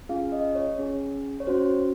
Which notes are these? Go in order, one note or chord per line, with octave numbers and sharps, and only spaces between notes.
C#4 F4 G#4 F5
D#5
C#5
C#4 G#4
C#5
C#4 F#4 C5